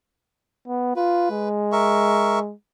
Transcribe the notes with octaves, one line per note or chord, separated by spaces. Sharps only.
B3
F4 B4
G#3
A#4 E5 C#6